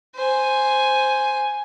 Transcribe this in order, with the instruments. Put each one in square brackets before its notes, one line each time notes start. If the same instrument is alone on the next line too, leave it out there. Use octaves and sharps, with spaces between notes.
[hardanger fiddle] C5 G#5